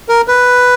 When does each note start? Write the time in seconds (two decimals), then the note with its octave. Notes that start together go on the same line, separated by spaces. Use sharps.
0.09 A#4
0.28 B4